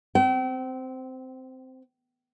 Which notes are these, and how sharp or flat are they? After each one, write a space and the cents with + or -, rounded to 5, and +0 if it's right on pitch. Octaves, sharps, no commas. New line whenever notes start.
C4 -10 G5 -40